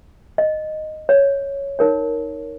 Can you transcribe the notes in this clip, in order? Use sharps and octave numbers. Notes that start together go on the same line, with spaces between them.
D#5
C#5
D#4 A#4 C#5